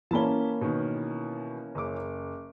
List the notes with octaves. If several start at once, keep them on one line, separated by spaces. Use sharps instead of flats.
E3 A#3 C#4 A5 B5 G7
B2 D#3
F#1 D6